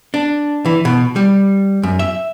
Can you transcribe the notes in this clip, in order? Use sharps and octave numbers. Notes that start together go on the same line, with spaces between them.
D4
E3
B2
G3
F#2
E5